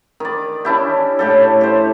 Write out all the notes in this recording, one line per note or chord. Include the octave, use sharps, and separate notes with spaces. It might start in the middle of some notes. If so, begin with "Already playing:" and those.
D#3 D5
C#4 D4 E4 G4
A2 G4 A4
G4 C5